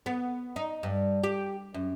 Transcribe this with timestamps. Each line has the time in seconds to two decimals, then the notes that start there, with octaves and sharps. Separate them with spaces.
0.06 B3
0.56 D#4
0.83 G2
1.23 G4
1.74 F#2